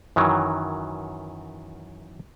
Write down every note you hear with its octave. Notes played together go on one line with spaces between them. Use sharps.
F#2 D#3 E3 F#3